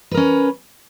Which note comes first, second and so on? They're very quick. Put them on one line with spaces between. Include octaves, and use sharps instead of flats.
B4 A#4 C#4